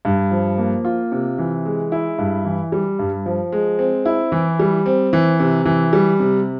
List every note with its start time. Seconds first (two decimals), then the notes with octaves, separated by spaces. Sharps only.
0.05 G2
0.31 F3
0.58 A#3
0.85 F4
1.12 C3
1.38 E3
1.65 G#3
1.92 E4
2.18 G2
2.45 E3
2.72 G3
2.99 G2
3.26 F3
3.52 G#3
3.79 C4
4.06 E4
4.32 E3
4.59 G3
4.86 C4
5.13 E3
5.40 C3
5.65 E3
5.93 G3
6.20 C3